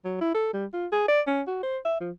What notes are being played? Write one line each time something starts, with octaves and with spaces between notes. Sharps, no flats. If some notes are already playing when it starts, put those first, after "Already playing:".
F#3
E4
A4
G3
F4
G#4
D5
C#4
F#4
C5
E5
F3